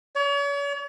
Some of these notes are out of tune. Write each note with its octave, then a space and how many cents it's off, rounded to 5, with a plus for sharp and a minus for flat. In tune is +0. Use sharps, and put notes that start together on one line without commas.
C#5 +40